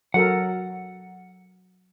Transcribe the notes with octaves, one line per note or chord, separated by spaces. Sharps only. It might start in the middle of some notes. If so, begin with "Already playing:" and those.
F#3 A4 A#4 F#5